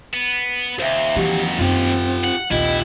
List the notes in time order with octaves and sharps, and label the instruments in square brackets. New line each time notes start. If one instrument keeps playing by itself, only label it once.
[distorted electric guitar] B3
[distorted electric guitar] D#2 [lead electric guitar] C5 E5
[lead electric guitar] F2 F#4 [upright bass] E3 [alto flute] G4
[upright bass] F#2 [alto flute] C4 [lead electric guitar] F4 G4
[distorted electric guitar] F#5
[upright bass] A#1 D#2 [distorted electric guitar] E4 [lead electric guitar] F4 G4 [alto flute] D#5